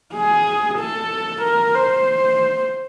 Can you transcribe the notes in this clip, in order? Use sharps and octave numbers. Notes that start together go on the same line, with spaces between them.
G#4
A4
A#4
C5